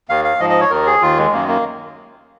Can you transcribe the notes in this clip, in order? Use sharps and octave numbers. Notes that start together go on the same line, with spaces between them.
D#2 D#3 F5
F5
G#2 F3 D#5
D#5
C#5
D#2 D#3 A#4
G#4
D#2 D#3 F4
G#3
F#2 D#3 A#3
A#3